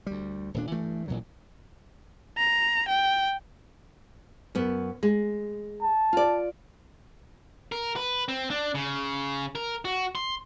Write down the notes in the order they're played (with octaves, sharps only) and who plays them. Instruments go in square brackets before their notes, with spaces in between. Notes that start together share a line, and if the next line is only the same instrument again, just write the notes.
[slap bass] D2 G3
D#1 A#2 D4
G2 E3 A3
A1 A#2 D3 F#3
[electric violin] A#5
G5
[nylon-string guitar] F#2 B3
G#3
[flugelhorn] A5
[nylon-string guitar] F4 D5
[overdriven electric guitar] A#4
B4
C4
D4
C#3
A#4
F#4
C6